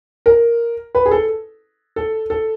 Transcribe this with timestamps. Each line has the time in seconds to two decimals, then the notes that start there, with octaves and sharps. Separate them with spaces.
0.26 A#4
0.95 B4
1.06 G#4
1.11 A4
1.96 A4
2.30 A4